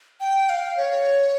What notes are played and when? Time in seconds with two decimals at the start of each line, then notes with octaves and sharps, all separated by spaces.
0.21 G5
0.50 F5
0.77 C#5